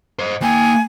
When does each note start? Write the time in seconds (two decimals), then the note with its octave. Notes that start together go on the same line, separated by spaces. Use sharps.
0.19 C5 D#5
0.42 A#3 G5 G#5